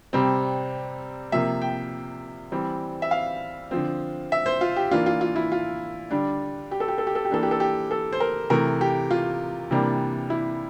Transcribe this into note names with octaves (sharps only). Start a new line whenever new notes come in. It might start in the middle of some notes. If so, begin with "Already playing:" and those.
C3 G3 C4
C3 F3 A#3 E5
G5
E3 G3 C4
E5
F5
D3 F3 C4
E5
C5
F4
G4
E3 A#3 D4 F4
F4
F4
E4
F4
D3 G3 D4
G4
A4
G4
A4
G4
A4
G4
E3 A#3 D4 A4
G4
A4
G4
A4
C5
A#4
C3 E3 A3 A#4
G4
F4
C3 E3 G3 A#3 D4
E4